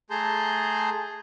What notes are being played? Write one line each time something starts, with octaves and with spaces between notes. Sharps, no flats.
A3 G#4 A5 A#5 C6 G6